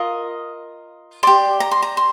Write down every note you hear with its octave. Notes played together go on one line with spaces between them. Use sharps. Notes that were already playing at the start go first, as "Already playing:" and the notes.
Already playing: F4 A#4 D#5
G4 D5 C6
A#5
C6
A#5
C6